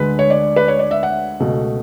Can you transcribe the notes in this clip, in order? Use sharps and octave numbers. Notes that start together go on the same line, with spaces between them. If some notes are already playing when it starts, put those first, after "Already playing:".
Already playing: D2 D3 G#3 B4
C#5
D5
B4
C#5
D5
E5
F#5
C#2 B2 A3